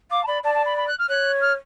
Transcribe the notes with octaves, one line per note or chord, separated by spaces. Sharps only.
F5 D6
A5
D5 B5
D5 A5
A5
B5
B5
F#6
F6
C#5 F#6
F6